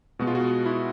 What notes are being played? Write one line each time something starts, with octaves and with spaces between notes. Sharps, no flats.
B2 G#3 B3 F#4
F4
F#4
E4